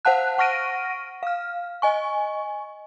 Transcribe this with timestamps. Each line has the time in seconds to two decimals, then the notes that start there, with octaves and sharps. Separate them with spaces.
0.05 C5 F5 F#5 A5 F#6
0.38 F#5 C#6 F6 A#6 D7 D#7
1.23 F5 F6
1.82 D#5 G#5 C#6